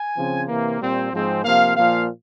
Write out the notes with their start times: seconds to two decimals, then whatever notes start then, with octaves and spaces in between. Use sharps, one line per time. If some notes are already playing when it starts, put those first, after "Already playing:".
Already playing: G#5
0.16 C#3 F3 C4
0.48 C3 E3 A#3
0.80 A#2 G3 C4
1.12 G#2 F3 G#3 C4
1.44 C3 F3 A#3 F5
1.76 A#2 F3 A#3 F5